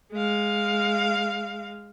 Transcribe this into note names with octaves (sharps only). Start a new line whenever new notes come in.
G#3 F5